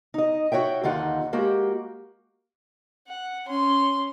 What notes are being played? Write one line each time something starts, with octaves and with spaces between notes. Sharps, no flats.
D#4 D#5
F#4 C#5 E5 G5
D#2 D3 D#4 F4 F#5
G#3 A#3 F#4 G4
F#5
C#4 C6